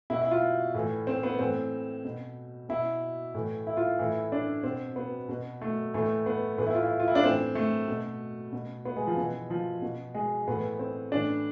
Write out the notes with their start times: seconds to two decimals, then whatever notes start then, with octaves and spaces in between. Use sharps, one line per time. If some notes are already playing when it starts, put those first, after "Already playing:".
0.10 B2 E4
0.22 E4
0.31 F4
0.74 A2 E3
1.07 C4
1.23 B3
1.39 A2 E3 C4
2.05 B2
2.69 B2 E4
3.34 A2 E3
3.67 E4
3.77 F4
3.99 A2 E3 E4
4.32 D4
4.63 B2 C4
4.96 B3
5.29 B2
5.61 A3
5.94 A2 E3 A3
6.26 B3
6.58 A2 E3 B3
6.67 E4
6.74 F4
6.82 E4
7.00 F4
7.08 E4
7.15 D4
7.24 A2 E3 C4
7.55 A3
7.88 B2
8.52 B2
8.85 B3
8.96 G#3
9.07 F3
9.17 B2 E3
9.50 F3
9.82 B2
10.14 G#3
10.47 A2 E3 B3
10.79 C4
11.12 A2 E3 D4